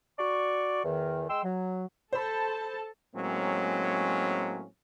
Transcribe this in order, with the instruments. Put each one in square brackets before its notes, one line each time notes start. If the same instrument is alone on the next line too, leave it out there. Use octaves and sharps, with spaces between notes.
[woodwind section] F#4 D5 C#6
E2 D#3
G#3 G5 C6 E6
F#3
[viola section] A4 A5 [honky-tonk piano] C5 B5
[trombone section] A2 F#3 G#3 A#3 C4 C#4